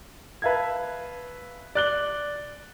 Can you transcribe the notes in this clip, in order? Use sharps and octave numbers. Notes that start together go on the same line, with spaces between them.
B4 E5 F5 A5 G#6
D5 F#6 G7